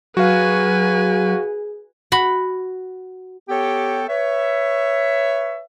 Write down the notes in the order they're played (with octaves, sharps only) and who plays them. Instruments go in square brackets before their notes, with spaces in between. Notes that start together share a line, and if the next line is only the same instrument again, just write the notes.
[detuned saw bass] F#3 [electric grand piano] F#4 F5 [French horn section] G#4 [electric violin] B4 G#5
[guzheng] F#4 B5
[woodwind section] B3 G4 A4 C#5 G5
B4 C#5 E5